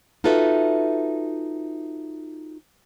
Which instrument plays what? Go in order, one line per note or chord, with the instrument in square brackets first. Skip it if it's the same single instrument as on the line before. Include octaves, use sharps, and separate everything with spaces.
[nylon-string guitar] D#4 F4 F#4 A4 B4 E5